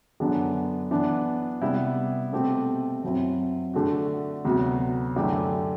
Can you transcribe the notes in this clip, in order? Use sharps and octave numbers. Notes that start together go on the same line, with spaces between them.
F#2 D3 F#3 B3 D4
E3 B3 D4
C3 G3 B3 E4
B2 A3 C4 G4
F#2 F#3 C4 E4
D3 A3 D4 F#4
D2 C3 F#3 B3 F#4
F#2 D3 A3 E4 G4